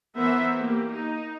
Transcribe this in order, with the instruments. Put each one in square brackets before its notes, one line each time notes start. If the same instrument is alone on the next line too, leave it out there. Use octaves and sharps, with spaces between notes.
[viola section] E3 B3 A#4 C5 E5
A#3 G4
D#4